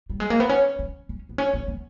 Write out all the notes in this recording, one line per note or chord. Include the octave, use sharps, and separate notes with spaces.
G3
G#3
A#3
B3
C#4
C#4
C#4
B3
C#4
B3
B3